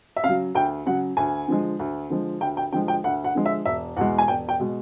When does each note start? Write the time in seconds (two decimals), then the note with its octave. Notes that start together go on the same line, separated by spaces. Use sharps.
0.16 E5
0.24 C#3 F#3 F5
0.55 D2 G5
0.86 C#3 F#3 F#5
1.17 D2 G#5
1.48 D3 F3 G#3
1.79 D2
2.10 D3 F3 G#3
2.41 D2 G5
2.57 G5
2.72 D3 F3 G#3 G5
2.88 G5
3.04 D2 F#5
3.24 F#5
3.35 D3 F3 G#3
3.46 E5
3.65 E1 E5
3.96 E2 B2 G#3 F#5
4.18 G#5
4.28 E1 G5
4.49 G5
4.59 B2 G#3